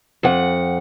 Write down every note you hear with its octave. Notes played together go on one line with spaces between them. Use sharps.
F2 F#5